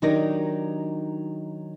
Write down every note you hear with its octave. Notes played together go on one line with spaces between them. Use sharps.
D#3 F#3 D4 D#4 G4 A#4